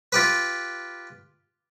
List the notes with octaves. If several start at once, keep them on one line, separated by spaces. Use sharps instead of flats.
F4 G4 B4